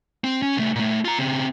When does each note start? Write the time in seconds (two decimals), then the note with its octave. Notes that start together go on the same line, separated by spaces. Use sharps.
0.24 C4
0.42 C#4
0.57 C2 A3
0.75 A#2 A3
1.05 F4 A#5
1.18 C#3 C4